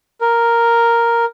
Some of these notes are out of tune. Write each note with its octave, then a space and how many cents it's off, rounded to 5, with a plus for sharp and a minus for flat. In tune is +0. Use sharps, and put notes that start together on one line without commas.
A#4 +0